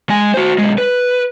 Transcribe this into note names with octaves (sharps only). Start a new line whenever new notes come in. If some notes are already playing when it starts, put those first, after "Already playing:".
G#3 G#5
F#4 C5
B1 G#3
B4